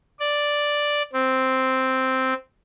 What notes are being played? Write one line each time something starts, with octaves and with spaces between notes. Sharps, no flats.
D5
C4